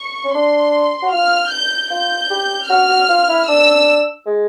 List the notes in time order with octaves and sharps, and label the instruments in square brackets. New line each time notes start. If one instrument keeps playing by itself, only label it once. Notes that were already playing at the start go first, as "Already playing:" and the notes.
Already playing: [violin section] C#6
[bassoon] C#4
[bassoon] D4 [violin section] C6
[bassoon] F#4
[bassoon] F4 [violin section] F6
[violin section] G6
[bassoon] F4 [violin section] G6
[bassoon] G4
[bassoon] F#4 [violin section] F6
[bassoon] F#4
F4
E4
[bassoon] D4 [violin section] E6
[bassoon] G#3